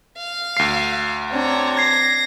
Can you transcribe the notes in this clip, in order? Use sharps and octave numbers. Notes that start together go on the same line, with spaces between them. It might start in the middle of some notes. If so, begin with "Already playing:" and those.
F5
D2 C7
C4 D4 C#5 A#5
G#6 A#6 C7